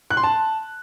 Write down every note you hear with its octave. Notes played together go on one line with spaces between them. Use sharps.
F#6
C6
A5